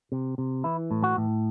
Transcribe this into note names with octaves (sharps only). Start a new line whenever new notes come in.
C3
C3
E3 E4
A2
F#4
A2